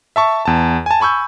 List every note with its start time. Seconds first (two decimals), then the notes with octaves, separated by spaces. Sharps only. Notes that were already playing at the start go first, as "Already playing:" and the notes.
0.16 E5 A5 C#6
0.45 E2 A5
0.86 G#5 A5
1.00 G#5 B5 C#6 E6 G6